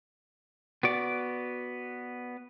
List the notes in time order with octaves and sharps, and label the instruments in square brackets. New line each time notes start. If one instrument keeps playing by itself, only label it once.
[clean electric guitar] B3 F#4 D5